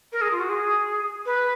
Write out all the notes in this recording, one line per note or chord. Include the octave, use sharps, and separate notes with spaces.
A#4
G#4
F4
F#4
G#4
B4